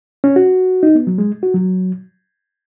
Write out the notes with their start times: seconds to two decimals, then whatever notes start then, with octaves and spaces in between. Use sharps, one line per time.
0.24 C#4
0.36 F#4
0.83 D#4
0.95 B3
1.07 F#3
1.18 G#3
1.43 F#4
1.54 F#3